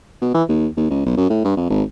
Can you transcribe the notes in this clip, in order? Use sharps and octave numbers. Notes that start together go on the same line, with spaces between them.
B2
E3
D#2
D#2
C#2
B1
F#2
A2
G2
F2
G#1